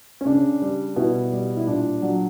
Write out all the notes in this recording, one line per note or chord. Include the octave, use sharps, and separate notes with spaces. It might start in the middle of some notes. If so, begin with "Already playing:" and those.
C#4
C#3 D4
G3
B2 E4
G3
E4
A#2 D4
F#3 D4